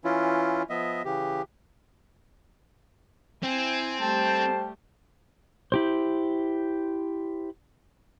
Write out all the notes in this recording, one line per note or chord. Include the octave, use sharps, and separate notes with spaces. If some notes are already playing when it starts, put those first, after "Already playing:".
E3 C#4 E4 F4
F3 B3 D#5 E5
C#3 E3 G4
C4 E4 G#5
G3 A3 C5 G5 A5
E4 G4 C5